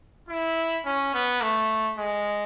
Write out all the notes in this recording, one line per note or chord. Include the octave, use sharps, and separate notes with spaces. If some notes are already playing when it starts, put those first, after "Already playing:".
E4
C#4
B3
A3
G#3